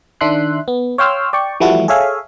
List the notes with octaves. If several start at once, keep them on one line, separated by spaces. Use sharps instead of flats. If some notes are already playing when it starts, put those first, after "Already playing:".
D#3 D4 E5 C6 F#6
B3
C#5 F5 G5 C6 E6 F6
D5 G5 C#6
E3 F3 G3 A3 E4 F#4
G#4 A4 C#5 E5 F5 G#5